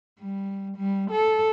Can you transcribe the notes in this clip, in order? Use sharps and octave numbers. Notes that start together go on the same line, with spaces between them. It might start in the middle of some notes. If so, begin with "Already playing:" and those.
G3
G3
A4